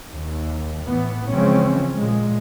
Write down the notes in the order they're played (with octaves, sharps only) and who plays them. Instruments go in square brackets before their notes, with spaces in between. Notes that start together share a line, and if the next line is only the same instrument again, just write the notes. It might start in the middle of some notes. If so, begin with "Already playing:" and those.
[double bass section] D#2
A2 E3 B3
C#3 E3 F3 G#3 C4 C#4
A#2 G#3